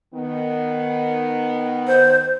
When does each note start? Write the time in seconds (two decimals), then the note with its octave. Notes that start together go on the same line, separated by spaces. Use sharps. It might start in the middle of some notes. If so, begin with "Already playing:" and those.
0.14 D#3 B3
1.87 C5